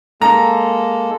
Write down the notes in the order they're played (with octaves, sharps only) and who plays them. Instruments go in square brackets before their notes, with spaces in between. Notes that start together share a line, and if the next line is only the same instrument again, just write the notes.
[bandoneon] G#3 A#3 A4 [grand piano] A#5